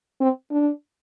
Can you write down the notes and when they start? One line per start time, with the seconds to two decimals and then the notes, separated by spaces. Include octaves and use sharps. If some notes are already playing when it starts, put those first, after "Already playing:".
0.21 C4
0.51 D4